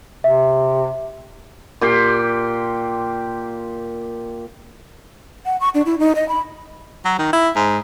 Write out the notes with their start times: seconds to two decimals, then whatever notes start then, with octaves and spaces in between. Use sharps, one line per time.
0.24 C3 E5
1.81 A#2 G4 C6
5.46 F#5
5.61 C#6
5.74 D4
5.86 E4
5.99 D#4
6.15 D#5
6.29 B5
7.05 F#3
7.19 D#3
7.32 E4
7.56 G#2